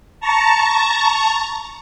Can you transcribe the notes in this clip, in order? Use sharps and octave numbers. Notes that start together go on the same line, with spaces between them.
A5 A#5 C#6